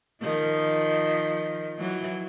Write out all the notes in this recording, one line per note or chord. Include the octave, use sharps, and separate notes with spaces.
D#3 F3
E3 F#3